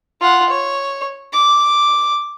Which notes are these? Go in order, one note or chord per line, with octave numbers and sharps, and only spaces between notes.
F4 F#5
C#5
D6